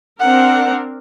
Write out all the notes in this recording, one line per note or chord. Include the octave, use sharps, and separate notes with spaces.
C4 D4 A#4 F#5